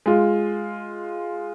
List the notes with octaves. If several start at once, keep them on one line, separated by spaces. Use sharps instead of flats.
G#3 F4